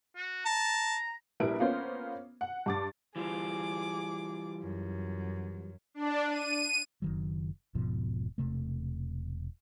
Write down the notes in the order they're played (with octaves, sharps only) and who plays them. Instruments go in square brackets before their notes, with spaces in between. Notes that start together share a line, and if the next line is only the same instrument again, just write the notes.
[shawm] F#4
[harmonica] A5 [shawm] A#5
[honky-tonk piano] A#1 G3 E4 A#4 B4 D7
A#3 B3 C#4 F4 C5
F#5
G2 D6 A6
[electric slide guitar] E3 G3 F4 [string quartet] G#4 D6
[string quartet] F#2
[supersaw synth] D4
D#7
[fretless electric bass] F#1 D#3 F#3
E1 G#2 B2 F3
E1 C3 A3